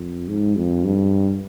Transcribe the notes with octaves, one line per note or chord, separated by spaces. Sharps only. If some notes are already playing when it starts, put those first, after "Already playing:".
Already playing: F2
G#2
F2
G2